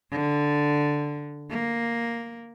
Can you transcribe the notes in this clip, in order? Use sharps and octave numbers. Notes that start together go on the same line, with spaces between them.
D3
A#3